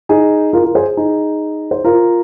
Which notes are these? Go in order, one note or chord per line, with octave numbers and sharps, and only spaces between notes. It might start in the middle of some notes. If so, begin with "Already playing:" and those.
D#4 G#4
F4 A#4
F4 A#4
G#4 C5
D#4 G#4
C5
F4 A#4